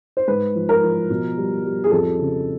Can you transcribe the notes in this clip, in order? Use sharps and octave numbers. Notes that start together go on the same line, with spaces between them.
C5
G#2 B4
F3
A#4
F3
B2
G3
G3
G#4
F2 A4
C#3